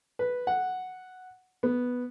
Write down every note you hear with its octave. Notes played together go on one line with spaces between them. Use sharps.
B4
F#5
B3